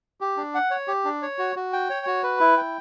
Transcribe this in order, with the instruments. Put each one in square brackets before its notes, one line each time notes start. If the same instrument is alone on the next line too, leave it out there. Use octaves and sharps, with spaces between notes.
[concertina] G4
D4
F#5
C#5
G4
D4
C#5
F#4
F#4
G5
C#5
F#4
B4
E4
G5